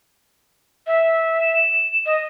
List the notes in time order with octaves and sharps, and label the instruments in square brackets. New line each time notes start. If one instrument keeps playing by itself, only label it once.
[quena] E5
[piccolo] E7
[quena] D#5